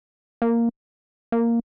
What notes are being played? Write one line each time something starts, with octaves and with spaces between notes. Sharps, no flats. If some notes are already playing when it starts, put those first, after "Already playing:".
A#3
A#3